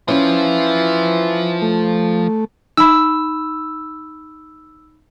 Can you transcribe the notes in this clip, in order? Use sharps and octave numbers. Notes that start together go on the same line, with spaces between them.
E3 F3 C#4 E4 F4
A3
D#4 B5 E6